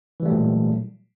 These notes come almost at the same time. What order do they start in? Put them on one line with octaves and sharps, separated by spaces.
E3 G3 A3 F#3 A#2